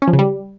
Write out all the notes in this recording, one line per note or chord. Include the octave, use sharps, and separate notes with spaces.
C#4
F3
C#3
G3